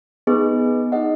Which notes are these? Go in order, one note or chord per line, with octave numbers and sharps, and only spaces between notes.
B3 D#4 G#4 B4 D#5
D#4 G#4 D#5 F#5